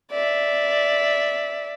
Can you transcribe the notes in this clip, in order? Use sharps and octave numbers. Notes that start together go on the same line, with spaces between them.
D5 E5